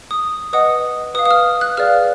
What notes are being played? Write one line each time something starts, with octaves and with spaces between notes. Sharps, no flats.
D#6
B4 D#5 F#5 D#6
B4 F5 D#6
D#6
F6
F#6
G#4 B4 D5 F5 F6